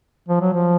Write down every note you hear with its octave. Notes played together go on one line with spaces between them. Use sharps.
F3
F#3
F3